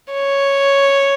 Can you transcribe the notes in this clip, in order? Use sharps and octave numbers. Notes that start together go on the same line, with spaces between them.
C#5